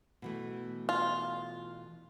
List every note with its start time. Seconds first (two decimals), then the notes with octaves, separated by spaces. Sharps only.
0.22 B2 E3 A3
0.89 F4